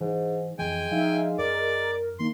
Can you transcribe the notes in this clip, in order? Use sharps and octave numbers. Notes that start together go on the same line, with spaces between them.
G#2 E3
F2 E3 G#3 G5 G#5
F3 D#4 E5 F5
F#2 A#4 D5
D#3 A#3 C6